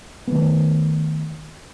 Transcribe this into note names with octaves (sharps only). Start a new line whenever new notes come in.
D#3 F#3 A3 B3